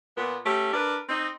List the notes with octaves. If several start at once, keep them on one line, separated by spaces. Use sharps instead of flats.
A#2 B3
A3 C#4 G4
D4 A#4 B4
C4 D#4